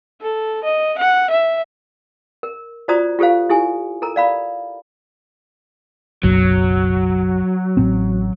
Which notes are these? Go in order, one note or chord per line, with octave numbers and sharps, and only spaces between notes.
A4
D#5
F#5
E5
A#4
F4 F#4 C5 D5 A#5 D#6
F4 G4 A4 C5 F5
E4 G4 A4 G#5
A4 A#4 A#5
D5 F5 B5
F#1 B1 F#2 F#3
A1 A2 C4